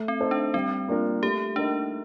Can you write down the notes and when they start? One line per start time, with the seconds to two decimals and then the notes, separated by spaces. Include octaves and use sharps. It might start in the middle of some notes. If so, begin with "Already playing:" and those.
Already playing: A3
0.08 C4
0.19 D#4 A4 C5
0.31 D4
0.54 G3 C4
0.88 A#3 D4 F4 A#4
1.23 A3 G4
1.56 D4 D#4 A#4 D#5